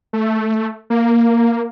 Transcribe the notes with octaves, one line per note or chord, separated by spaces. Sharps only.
A3
A#3